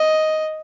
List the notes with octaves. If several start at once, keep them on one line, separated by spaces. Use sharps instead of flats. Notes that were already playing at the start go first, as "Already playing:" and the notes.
Already playing: D#5